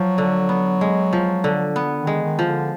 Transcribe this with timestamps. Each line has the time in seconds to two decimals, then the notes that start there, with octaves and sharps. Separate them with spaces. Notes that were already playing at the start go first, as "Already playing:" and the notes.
Already playing: F3 F#3
0.18 D3
0.49 B3
0.81 G#3
1.13 F3
1.44 D3
1.76 B3
1.99 D#3
2.07 G#3
2.23 D#3
2.39 F3
2.46 D3